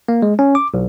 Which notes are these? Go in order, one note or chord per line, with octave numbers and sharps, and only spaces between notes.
A#3
G#3
C#4
D6
B1